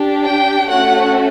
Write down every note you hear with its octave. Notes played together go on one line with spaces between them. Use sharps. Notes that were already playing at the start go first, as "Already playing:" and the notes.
Already playing: D4 G4
G5
A3 C#4 F#4 A4 F#5